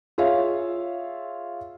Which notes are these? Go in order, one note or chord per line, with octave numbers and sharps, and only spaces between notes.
F4 G#4 C#5 E5 F5